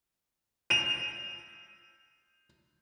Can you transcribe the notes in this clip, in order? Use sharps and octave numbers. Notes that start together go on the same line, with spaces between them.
D#7 F7